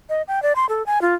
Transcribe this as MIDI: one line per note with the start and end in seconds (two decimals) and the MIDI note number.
0.09 0.22 75
0.28 0.42 79
0.43 0.56 74
0.56 0.66 84
0.69 0.85 69
0.86 1.01 80
1.02 1.15 65